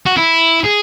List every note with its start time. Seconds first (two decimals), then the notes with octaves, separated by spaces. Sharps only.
0.06 F#4
0.17 E4
0.64 G#4